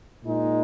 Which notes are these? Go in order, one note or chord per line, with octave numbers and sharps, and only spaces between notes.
A#2 G#3 D#4